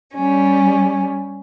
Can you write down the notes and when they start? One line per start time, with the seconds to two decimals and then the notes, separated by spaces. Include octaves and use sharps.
0.13 G3 C#4